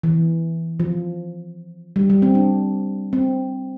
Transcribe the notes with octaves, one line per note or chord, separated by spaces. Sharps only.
E3
F3
G3
G3
C4
D4
C4